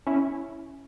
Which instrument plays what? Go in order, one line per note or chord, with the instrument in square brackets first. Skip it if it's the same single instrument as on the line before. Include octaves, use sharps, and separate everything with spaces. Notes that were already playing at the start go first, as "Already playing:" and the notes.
[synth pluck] C#4 E4